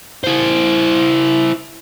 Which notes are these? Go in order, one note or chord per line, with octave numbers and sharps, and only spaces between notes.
E4 C5